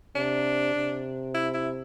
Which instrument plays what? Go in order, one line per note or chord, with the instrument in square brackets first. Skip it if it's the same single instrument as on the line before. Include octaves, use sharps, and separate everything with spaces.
[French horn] C3 [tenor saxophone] D4
[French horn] C3
[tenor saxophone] E4
E4